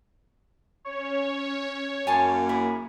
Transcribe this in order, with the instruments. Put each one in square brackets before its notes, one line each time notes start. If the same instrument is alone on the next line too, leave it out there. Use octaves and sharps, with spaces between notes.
[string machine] C#4 [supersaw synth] C#5
[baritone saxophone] F#2 [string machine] A#3 [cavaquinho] G#5 A5 C6
[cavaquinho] E4 G#4